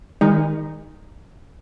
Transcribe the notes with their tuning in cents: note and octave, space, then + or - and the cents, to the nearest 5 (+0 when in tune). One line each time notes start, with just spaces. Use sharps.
D#3 +0 G#3 -40 D#4 +0